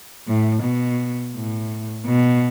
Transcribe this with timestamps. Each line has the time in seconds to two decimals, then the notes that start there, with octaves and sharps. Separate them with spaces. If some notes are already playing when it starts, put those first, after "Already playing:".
0.27 A2
0.63 B2
1.34 A2
2.06 B2